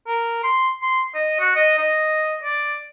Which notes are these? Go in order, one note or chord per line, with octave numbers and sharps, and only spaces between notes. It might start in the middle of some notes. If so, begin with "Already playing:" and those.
A#4
C6
C6
D#5
F#4
D#5
D#5
D5